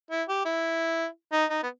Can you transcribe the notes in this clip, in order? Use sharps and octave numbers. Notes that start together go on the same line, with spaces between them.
E4
G4
E4
D#4
D#4
B3